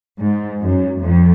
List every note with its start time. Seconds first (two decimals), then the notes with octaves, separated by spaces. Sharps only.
0.20 G#2
0.61 F#2
1.01 F2